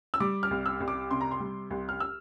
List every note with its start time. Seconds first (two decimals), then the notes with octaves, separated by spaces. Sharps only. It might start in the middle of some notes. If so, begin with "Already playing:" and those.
0.14 E6
0.20 G3 D6
0.43 F6
0.51 C2
0.66 E6
0.80 C2
0.88 D6
1.11 C3 C6
1.21 A#5
1.31 C6
1.40 G3
1.70 C2
1.89 F6
2.00 E6